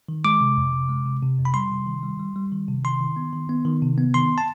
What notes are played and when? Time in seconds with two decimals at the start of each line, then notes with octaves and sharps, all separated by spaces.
0.08 D#3
0.25 G#3 D6
0.41 C3
0.57 F2
0.73 C3
0.89 G#3
1.06 C3
1.22 C3
1.38 F2
1.45 B5
1.54 G3 C6
1.71 C3
1.87 D#3
2.03 G3
2.19 G3
2.36 G3
2.52 D#3
2.68 C3
2.84 D#3 C6
3.01 D#3
3.16 B3
3.33 D#3
3.49 B3
3.65 D#3
3.82 C3
3.98 B3
4.14 D#3 C6
4.38 A5